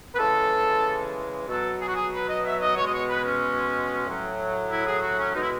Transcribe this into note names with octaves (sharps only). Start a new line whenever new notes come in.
B4
C#3 E3 G#3 A4
B2 F#3 A4
G#4
F#4
G#4
B4
D#5
E5
D#5
B2 G#3 C#5
D#5
C#5
B4
C#4
A2 F#3
E4
G#4
F#4
C#4
B2 G#3 D#4
E4